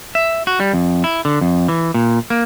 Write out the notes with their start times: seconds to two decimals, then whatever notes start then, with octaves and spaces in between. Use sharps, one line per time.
0.15 E5
0.47 F#4
0.60 G3
0.74 F2
1.04 E4
1.25 D3
1.41 F2
1.68 E3
1.94 A#2
2.30 A#3